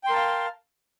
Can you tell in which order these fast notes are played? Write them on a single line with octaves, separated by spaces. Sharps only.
G5 C6 A#4 A5 F5